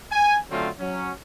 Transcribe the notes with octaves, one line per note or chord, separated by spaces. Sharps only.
G#5
D3 F#3 A3 C4 C#4 F4
F#3 C#4